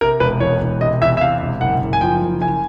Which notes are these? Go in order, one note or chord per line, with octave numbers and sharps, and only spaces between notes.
C3 A#4
E1 B4
E2 C#5
E1
C3 D#5
E2 E5
E5
C3 F5
E1
F#1 F#5
F#1
G#5
F3 G5
F#1
F#1 G#5